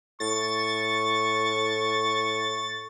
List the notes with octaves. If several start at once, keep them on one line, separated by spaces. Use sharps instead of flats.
A2 C#6 A6